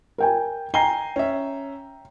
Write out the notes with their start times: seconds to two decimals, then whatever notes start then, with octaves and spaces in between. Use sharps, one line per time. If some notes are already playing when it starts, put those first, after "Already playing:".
0.18 A#4 G5 G#5
0.74 G5 G#5 A#5 C7 G7
1.16 C#4 E5